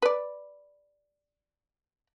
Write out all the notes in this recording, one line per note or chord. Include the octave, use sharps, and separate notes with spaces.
B4 D5